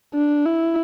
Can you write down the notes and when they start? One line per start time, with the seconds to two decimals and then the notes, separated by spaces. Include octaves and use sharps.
0.14 D4
0.46 E4